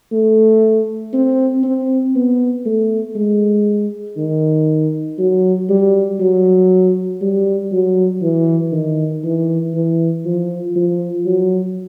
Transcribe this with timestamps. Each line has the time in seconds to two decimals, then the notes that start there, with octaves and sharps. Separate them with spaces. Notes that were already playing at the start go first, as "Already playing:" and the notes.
0.12 A3
1.13 C4
1.64 C4
2.15 B3
2.66 A3
3.16 G#3
4.17 D#3
5.19 F#3
5.69 G3
6.20 F#3
7.21 G3
7.72 F#3
8.22 E3
8.72 D#3
9.24 E3
9.75 E3
10.25 F3
10.76 F3
11.26 F#3